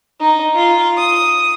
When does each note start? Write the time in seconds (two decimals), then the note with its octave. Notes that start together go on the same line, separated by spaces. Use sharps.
0.20 D#4
0.57 F4
0.97 D#6